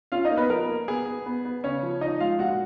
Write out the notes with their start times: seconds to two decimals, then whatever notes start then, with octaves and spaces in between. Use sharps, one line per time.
0.12 C#4 F4 F5
0.25 D#4 D#5
0.31 A#3
0.37 B3 B4
0.50 F3 A#4
0.70 A#3
0.88 B3 G#4
1.06 B3
1.26 B3
1.45 B3
1.64 C#3 C#4 C#5
1.83 F3
2.01 F3 D#4 D#5
2.20 G#3 F4 F5
2.39 A#2 F#4 F#5